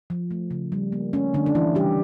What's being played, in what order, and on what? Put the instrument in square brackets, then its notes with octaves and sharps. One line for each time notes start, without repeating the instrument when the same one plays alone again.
[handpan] F3
A3
C#3
G3
A#3
A3 C#4
D3 A3 D4
D4
D3 E3 E4
C#3 G3 G4